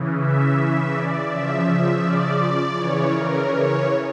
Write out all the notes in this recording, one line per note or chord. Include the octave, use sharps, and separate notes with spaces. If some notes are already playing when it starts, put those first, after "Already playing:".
Already playing: C#3 E3
E5
D5
C#3 F3 E5
E5
D5
D5
C#3 E3 C#5
A#4
C#5